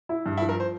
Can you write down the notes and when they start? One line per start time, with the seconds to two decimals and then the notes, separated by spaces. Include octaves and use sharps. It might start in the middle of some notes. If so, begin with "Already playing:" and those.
0.09 E4
0.26 G2
0.37 E4
0.41 F3
0.49 A#4
0.60 C5